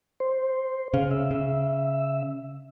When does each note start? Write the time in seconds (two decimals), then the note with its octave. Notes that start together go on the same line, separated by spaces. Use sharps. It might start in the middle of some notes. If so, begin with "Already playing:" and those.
0.20 C5
0.94 C#3 F5
1.11 E5
1.31 C#3